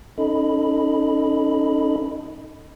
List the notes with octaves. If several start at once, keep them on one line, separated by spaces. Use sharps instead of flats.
C#4 D#4 A4 D#5 B5